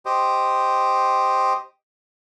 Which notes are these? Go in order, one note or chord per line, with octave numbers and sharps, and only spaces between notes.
G4 C5 D#5